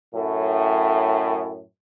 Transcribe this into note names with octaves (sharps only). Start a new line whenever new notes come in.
F#2 A2